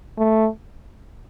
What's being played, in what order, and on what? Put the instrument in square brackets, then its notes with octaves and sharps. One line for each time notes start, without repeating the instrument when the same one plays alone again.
[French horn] A3